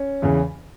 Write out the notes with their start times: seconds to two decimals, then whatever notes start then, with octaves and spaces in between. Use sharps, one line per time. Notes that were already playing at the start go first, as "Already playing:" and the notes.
Already playing: C#4
0.22 E2 C#3 E3